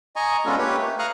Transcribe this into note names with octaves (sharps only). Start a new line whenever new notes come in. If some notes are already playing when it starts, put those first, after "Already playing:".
D#5 G#5 A#5 C#6
G#3 B3 C#4 D4 F4 A4
A#3 G4 B4 C#5
A3
F5 A#5 C#6 D#6 F6 F#6